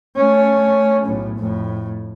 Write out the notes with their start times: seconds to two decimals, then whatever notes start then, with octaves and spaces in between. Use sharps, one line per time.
0.16 A3 C#4
1.05 B1 A2
1.38 F2 A2